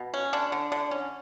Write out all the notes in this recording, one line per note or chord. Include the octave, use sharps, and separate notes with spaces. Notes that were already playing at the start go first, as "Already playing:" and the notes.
Already playing: B2
C#4
D3 D4
D3
D3
C#4